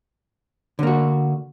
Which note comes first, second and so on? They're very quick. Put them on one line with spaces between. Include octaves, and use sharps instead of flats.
D3 A#3 F#4